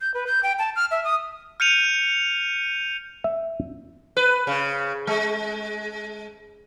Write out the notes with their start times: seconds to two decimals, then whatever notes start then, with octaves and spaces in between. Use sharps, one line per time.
0.01 G6
0.14 B4
0.27 G6
0.43 G5
0.59 A5
0.76 F6
0.91 E5
1.05 D#6
1.60 F6 G6 C#7 D#7 F7
3.24 E5
4.17 B4
4.47 C#3
5.07 G#3